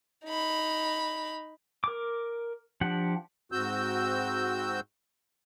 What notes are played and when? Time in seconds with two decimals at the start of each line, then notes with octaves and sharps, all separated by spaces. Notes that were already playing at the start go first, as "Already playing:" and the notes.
0.25 D#4 B5
1.84 A#4 D6
2.81 F3 D4 G4 F#5
3.52 G#2 C4 F#4 E6 G6